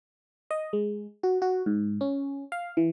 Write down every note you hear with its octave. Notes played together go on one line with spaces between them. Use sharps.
D#5
G#3
F#4
F#4
G#2
C#4
F5
E3